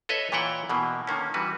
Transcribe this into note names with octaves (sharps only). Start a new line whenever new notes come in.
A4 B4 C#5 D#5 E5
A#2 E3 E4 C#5 F#5 G5
B2 E3 A#3
D3 D#3 A#3 C#4
E3 G3 F#4 B4